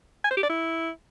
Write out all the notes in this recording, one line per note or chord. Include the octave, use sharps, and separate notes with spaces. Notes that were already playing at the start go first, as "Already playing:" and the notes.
G#5
C5
G4
D5
E4